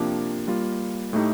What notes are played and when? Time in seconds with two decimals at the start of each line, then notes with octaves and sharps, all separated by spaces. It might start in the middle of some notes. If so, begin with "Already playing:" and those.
Already playing: C3 F3 A#3 D4 G4
0.47 G3 A#3 F4
1.13 A2 A3 D#4 G4